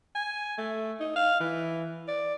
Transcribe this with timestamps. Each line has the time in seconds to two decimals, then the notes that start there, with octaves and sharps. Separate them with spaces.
0.15 G#5
0.58 A3
1.00 D#4
1.16 F5
1.40 E3
2.08 D5